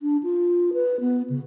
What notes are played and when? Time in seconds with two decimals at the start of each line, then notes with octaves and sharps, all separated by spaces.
0.02 D4
0.23 F4
0.74 B4
1.00 B3
1.30 C#3